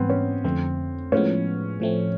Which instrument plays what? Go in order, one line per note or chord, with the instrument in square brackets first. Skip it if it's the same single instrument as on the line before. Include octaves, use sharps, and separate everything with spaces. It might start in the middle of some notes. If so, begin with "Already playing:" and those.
Already playing: [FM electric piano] G#2 E3 G3 [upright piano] B3 C4
[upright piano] C#4
[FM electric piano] F2 D3 F3 A3 [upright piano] C4
[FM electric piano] A2 F3 G#3 B3 [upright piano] C#4
[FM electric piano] A2 F3 A3 C4